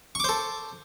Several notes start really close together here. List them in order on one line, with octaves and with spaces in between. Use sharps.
C#6 D6 C5 A4